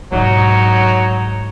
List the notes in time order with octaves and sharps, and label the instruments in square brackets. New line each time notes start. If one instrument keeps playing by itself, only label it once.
[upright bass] G#2 B2 [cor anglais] F#3 [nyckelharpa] D#4 C#5